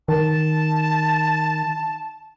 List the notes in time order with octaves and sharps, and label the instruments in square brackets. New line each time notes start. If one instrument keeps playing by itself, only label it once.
[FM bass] D#3 [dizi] A5